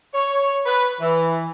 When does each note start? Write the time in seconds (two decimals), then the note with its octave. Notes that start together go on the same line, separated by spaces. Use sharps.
0.14 C#5
0.66 B4
1.01 E3